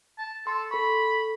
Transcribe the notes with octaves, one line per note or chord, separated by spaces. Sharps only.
A5
A4 C6
A4 B5 C#6